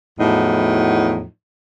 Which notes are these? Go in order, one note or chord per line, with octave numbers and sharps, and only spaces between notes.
E2 A2 F3 F#3 D#4